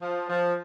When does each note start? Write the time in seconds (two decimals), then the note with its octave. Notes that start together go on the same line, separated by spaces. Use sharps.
0.02 F3
0.30 F3